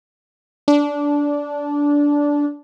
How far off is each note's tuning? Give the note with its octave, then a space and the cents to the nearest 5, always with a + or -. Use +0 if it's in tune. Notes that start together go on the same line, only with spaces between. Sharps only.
D4 -15